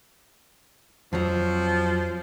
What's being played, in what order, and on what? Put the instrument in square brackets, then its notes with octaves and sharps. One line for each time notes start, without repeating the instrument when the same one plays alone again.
[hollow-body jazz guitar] F2 F#3 [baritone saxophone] F3